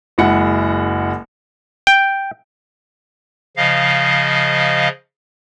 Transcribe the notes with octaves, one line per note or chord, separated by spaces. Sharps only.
F#1 G#3 E4 F#5 C#7
G5
C#3 F3 D#5 F5